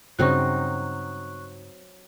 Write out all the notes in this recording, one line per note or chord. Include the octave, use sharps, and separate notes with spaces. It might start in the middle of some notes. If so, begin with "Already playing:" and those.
G2 C#3 F#3 C4 D#4 C#6 F#6